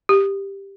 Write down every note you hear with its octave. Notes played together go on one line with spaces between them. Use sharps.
G4